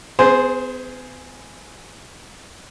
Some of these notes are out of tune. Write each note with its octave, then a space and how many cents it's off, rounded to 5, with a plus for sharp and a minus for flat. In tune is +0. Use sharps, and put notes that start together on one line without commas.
B3 +45 G#4 +0 C5 +0